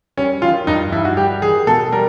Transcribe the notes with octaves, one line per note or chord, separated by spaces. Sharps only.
G3 C#4
D#3 F4
G2 D#4
G2 E4
F#4
G3 G4
D#3 G#4
B2 A4
G3 A#4